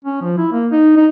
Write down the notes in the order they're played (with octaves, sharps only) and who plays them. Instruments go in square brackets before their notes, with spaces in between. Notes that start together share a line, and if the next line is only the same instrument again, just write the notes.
[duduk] C#4
F3
E4
A#3
D#4
D#4